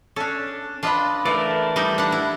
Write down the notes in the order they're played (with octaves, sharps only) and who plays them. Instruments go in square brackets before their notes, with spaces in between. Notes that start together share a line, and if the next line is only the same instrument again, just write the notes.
[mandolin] C#4 D4 [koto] A4
[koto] D4 F4 [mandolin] B4 D#5 B5
[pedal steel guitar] E3 A3 A#4 [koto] D5
[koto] G3 D#4 E4
[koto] D4 F#5 [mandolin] B5
[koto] E4